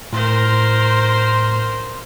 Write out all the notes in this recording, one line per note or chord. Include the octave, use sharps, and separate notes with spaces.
A2 A#4 C5 C6